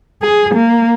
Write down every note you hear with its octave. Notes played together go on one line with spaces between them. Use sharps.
G#4
A#3